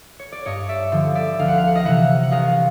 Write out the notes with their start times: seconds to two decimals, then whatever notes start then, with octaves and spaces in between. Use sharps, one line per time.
0.19 C#5
0.32 D5
0.45 G2 C#5 D#5
0.68 D5 E5
0.92 D3 F3
1.15 D5 E5
1.39 D2 F5
1.48 F#5
1.58 F5
1.67 F#5
1.75 D#5 F5
1.85 C3 E3 E5 F#5
2.23 F#5
2.31 C2 D#5 F5